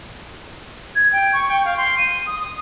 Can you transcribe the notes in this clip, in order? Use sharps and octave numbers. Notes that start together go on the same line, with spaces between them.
G#6
G5
C#6
G5
F5
C6
D#7
D#6
D#6